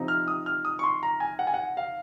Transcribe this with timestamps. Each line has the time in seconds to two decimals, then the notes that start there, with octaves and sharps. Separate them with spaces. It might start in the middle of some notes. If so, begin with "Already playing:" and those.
Already playing: C3 F3 C4 D#4
0.08 F6
0.28 D#6
0.46 F6
0.65 D#6
0.79 C#6
0.84 C6
1.03 A#5
1.20 G#5
1.39 F#5
1.47 G#5
1.54 F#5
1.77 F5